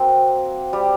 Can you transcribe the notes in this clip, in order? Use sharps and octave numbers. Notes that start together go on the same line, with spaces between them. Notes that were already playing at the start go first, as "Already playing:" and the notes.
Already playing: A#3 C4 F#4
G3